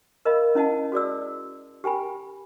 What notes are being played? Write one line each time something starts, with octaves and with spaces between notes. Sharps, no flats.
A#4 D#5 F5 B5
C#4 E4 D#5 F#5 A5
F#4 G#4 D5 E6
G4 G5 G#5 B5